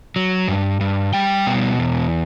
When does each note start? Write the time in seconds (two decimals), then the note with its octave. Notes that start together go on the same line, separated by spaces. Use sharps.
0.16 F#3
0.48 G2
0.81 G2
1.13 G3 G5
1.47 B2
1.79 E2